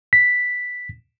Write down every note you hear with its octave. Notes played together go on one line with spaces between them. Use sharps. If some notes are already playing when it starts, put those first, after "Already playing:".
B6